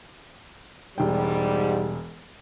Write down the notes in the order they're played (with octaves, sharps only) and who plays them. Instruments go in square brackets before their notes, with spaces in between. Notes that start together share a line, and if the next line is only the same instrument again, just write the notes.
[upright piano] E1 G5 [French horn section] G#2 G3